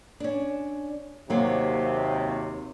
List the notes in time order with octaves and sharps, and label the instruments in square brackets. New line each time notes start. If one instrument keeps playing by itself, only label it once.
[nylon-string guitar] C#4 D4
[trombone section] D#2 C3 [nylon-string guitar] F#3 A#3